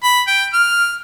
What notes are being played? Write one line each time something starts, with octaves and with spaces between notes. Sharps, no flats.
B5
G5
F6